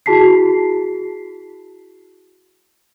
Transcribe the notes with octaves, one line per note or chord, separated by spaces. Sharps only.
E4 F#4 G#4 A5 B6 C7